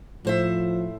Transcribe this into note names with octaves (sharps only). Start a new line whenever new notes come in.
A2 F3 C5 E5